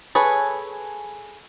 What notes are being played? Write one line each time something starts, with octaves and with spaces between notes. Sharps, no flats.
G#4 A4 B4 C#5